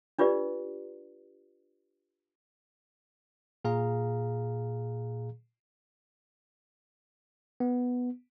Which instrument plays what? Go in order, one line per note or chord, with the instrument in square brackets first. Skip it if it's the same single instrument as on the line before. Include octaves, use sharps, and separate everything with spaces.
[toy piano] D4 F4 G4 B4 D5
[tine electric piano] A#2 G#4 F5 A#5
B3